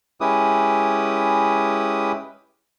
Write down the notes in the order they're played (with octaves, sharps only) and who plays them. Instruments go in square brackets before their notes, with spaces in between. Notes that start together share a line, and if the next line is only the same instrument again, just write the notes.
[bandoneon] G#3 C#4 E4 G4 B4 D#6